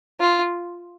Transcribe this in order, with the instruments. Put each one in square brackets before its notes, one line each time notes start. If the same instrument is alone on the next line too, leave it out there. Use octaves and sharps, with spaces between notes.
[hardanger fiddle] F4